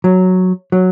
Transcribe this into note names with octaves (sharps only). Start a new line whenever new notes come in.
F#3
F#3